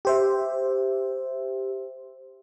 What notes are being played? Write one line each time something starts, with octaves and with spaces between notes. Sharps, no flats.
G4 C5 E5